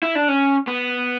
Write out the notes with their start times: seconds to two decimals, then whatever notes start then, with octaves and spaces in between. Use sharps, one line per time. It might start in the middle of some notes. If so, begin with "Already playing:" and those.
0.03 E4
0.15 D4
0.28 C#4
0.67 B3